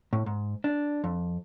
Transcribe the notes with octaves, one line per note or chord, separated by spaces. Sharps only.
A2
G#2
D4
F2